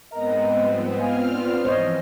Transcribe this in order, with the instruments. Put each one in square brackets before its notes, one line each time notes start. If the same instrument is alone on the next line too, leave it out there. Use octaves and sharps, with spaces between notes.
[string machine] G#2 B3 C4 [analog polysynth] A#4 A#5 [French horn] D#5
[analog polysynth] F3 G3
[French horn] B3 [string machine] C4 F4 F6 [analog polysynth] D#5 F5 G#5
[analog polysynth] A#3 B3 D4 [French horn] D5
[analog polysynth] G#2 [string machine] E3 F3 [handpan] C5 C#5 D#5